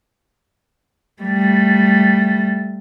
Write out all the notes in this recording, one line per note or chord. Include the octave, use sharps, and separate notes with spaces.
G3 A3